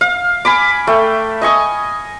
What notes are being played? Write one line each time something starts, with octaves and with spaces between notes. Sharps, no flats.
F5
G#5 B5 D6
A3 G5
D#5 G#5 C#6 D#6